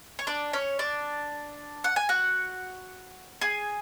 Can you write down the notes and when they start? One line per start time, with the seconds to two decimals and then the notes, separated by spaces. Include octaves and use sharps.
0.19 C#5
0.27 D4 D5
0.53 C#4 C#5
0.79 D4 D5
1.84 F#5
1.96 G#5
2.09 F#4 F#5
3.41 G#4 G#5